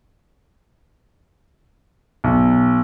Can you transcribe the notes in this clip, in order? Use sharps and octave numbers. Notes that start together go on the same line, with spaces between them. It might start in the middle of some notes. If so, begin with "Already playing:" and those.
B1